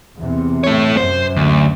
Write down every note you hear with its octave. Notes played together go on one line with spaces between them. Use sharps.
E2 C3
A3 C#5
F#2 C5
D2